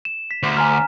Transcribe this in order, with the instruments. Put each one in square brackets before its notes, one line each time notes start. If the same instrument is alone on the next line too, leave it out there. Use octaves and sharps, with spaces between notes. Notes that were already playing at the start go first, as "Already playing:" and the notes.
[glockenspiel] E7
B6
[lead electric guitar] D2
[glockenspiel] G#5 A#5 F6